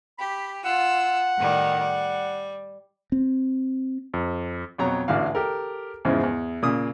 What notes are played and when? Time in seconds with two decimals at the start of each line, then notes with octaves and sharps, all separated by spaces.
0.18 G4 B5
0.65 F4 F#5 E6
1.36 A2 D#3 G3
1.80 G3
3.12 C4
4.14 F2
4.78 F2 B2 F#3 C#5 A#5
5.08 A1 D3 E3 F#4 F5
5.35 G4 A4 A#4
6.05 E2 G#2 C#3 E3 F3
6.23 E2
6.63 A#2 C#3 D#6